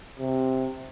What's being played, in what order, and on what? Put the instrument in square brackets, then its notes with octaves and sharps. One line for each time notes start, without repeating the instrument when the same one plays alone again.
[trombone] C3